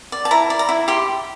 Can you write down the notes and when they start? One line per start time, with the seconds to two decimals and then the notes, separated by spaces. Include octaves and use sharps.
0.12 D5
0.25 A5
0.31 E4 A#5
0.50 D5
0.59 A#5
0.69 E4
0.88 G4 C6